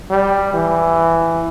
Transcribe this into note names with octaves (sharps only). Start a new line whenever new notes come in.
G3
E3